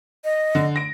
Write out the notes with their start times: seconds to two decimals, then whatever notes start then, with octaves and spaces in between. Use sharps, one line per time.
0.24 D#5
0.55 D3
0.76 A#6 D7